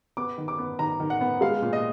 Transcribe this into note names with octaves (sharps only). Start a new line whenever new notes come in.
B3 D6
D#3
D6
B3
D#3 A#5
D#3
F#5
B3
G#3 F5
A#2
D#5